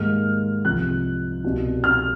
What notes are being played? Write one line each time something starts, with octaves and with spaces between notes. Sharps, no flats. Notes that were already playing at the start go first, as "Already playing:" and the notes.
Already playing: G#2 D#3 G3 A#3 F6
C2 C3 F3 F#6
C2 B2 G3
F6